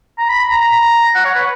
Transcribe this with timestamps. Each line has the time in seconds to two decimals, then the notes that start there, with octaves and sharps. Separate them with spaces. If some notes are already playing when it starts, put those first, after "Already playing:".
0.18 A#5
0.29 B5
0.40 B5
0.50 A#5
1.15 F#5
1.25 C#5
1.35 B4